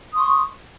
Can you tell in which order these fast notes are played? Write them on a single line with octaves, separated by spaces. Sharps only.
D#6 C6 C#6